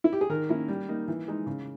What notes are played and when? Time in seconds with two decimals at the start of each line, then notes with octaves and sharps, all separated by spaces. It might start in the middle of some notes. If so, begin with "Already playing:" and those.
0.04 E4
0.13 G4
0.21 G#4
0.29 D#3 A#4
0.49 A#3 C#4 E4
0.68 G3
0.89 A#3 D#4
1.08 E3
1.28 G#3 D#4
1.46 C#3